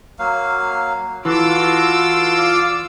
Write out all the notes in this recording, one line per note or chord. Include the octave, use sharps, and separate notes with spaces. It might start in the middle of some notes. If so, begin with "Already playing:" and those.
F#3 A#3 F5
E3 F4 F#4 A4 C6 D6 E6
D5 F5